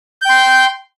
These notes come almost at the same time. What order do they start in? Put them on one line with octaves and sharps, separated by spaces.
G6 G5 C6